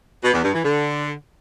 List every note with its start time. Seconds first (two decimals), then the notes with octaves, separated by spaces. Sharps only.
0.24 B2
0.34 E2
0.44 G2
0.54 E3
0.64 D3